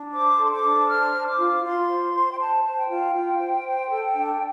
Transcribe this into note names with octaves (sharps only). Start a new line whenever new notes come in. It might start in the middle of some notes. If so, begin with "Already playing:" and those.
Already playing: D4
C5 D6
A4
C6
D6
D4
C5 F6
C5
D6
F4
F4 C6
C5
C5
G5
C5 A5
C5
G5
F4
F4
C5
C5
A4
D4